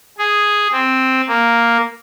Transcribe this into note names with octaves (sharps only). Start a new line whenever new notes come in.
G#4
C4
A#3